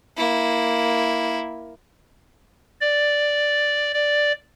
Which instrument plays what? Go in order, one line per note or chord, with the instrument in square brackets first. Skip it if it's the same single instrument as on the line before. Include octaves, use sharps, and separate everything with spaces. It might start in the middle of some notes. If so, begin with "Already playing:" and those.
[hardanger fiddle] A#3 E4
[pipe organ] D5
D5